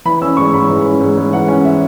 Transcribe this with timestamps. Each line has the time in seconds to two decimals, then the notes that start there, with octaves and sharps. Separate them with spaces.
0.05 E3 B5
0.22 C#4 E6
0.37 G#2 C#6
0.53 G#2 B5
0.69 E3
0.86 C#4
1.00 G#2
1.17 G#2
1.32 E3 F#5
1.48 C#4
1.65 E5